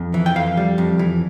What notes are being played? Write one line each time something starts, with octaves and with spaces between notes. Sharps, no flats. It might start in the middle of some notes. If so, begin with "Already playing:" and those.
Already playing: F2
E3
G5
F2 F5
G3
F2
E3